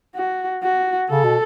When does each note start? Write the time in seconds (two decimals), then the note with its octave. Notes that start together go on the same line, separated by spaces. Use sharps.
0.15 F#4
0.63 F#4
1.10 C#3 A4
1.24 B2